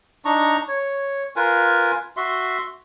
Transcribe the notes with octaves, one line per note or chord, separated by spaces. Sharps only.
D4 D#4 A#5 C#6
C#5
F4 A#4 B4 G#5
F#4 E5 C6